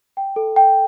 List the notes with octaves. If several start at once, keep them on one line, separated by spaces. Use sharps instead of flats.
G5
A4
G5